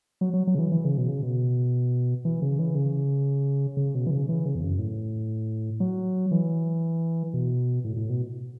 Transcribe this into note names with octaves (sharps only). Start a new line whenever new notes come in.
F#3
F#3
F#3
C#3
E3
E3
C#3
B2
C#3
B2
E3
C#3
E3
C#3
C#3
B2
E3
C#3
E3
C#3
E2
F#2
A2
F#3
E3
B2
A2
A2
B2